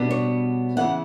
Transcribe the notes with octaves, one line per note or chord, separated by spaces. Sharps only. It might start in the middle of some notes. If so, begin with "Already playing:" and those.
Already playing: B2 G3 B3 D4
C#5
C#3 E3 B3 E4 F#5